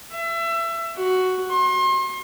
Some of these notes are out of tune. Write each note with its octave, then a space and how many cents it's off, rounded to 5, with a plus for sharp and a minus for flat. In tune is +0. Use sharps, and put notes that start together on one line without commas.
E5 +25
F#4 +5
C6 +35